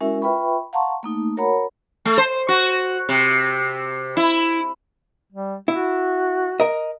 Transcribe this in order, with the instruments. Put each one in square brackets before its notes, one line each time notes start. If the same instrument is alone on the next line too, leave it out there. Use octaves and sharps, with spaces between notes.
[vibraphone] G#3 C#4 E4 F#4 A#4 E5
F4 B4 E5 G5 B5 C#6
F5 F#5 A5 A#5 C6 C#6
A3 A#3 D#4
F#4 A#4 C#5 F#5 A#5 B5
[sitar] A3
C5
F#4
C3
E4
[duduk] G3
[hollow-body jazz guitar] E4 [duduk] F#4
[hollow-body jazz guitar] A#4 D#5